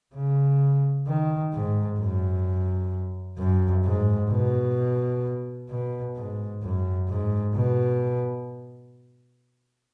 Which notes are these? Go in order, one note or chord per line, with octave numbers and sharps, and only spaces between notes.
C#3
D#3
G#2
F#2
F#2
G#2
B2
B2
G#2
F#2
G#2
B2